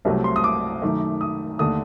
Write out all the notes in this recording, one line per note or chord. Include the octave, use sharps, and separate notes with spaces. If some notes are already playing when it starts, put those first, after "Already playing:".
C2 C3 F#3 A3
C6
D#6
D6
F#2 D#3 A3
D#6
D#2 D3 A3 D4 D#6